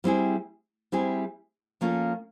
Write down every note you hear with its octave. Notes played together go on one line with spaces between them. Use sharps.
G3 C4 E4 G#4
G3 C4 E4 G#4
F3 A#3 C#4 F4 A4